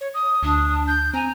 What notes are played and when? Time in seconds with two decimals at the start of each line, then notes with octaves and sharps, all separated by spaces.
0.01 C#5
0.14 D#6
0.43 D2 D4
0.88 G6
1.14 C4 G#5 A#5